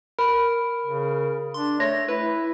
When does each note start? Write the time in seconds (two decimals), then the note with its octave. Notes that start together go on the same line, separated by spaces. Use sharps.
0.19 A#4 B5
0.86 C#3
1.54 D4 C6
1.80 A3 C#5 A#6
2.08 E4 B4